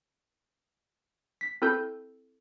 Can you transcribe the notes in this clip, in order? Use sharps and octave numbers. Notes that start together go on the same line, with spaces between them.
B6
C4 E4 A4 E6 G6